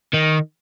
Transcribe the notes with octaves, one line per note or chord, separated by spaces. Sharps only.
D#3